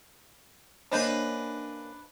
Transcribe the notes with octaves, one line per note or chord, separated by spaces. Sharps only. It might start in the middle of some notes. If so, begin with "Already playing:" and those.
A#3 C#4 D4 B4 C5 D#5 G6